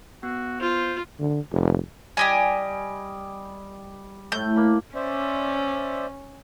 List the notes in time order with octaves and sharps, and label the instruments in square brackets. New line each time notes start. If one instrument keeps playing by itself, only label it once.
[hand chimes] B3 [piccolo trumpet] F#4
[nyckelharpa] F4 [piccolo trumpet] C5
[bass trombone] D3
F1
[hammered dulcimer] G3 [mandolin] G4 D#5 G#5
[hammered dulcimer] A2 A3 [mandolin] G6
[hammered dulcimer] A#3 B5
[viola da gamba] C#4 [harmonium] C5 D5 E5